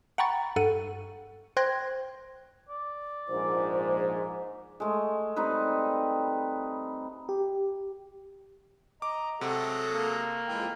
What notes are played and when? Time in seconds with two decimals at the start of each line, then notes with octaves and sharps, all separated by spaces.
0.18 F#5 G5 A#5 B5 C#6 A6
0.56 G2 A4 F#5 D#7
1.57 C5 G5 C6 F#6 G#6 A#6
2.69 D5
3.29 A#1 G#2 C5
4.80 G#3 A3
5.36 G3 C4 D#4 B4
7.29 G4
9.02 D#5 A#5 D6
9.41 C3 F#3 G#3 A3 A4 F#5
9.93 A#3
10.48 F2 E3 G#3 G5